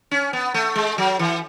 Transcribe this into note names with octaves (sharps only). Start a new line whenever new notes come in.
C#4
B3
A3
G#3
F#3
E3